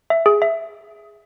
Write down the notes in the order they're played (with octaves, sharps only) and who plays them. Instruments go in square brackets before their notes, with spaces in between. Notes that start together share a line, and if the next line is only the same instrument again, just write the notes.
[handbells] E5
G#4
E5